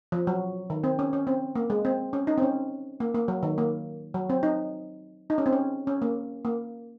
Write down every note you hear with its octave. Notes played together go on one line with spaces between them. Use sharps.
F3
F#3
D#3
C4
C#4
C#4
C4
A#3
G#3
C4
C#4
D#4
C4
C#4
A#3
A#3
F#3
D#3
A#3
F#3
C4
D#4
D#4
C#4
C4
C#4
C#4
A#3
A#3